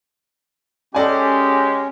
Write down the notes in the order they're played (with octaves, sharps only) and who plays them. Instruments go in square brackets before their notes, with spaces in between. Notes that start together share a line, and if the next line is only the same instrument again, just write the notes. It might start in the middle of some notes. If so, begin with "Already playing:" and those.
[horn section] G#3 G4 [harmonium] C#4 [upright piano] A4 D5 G#5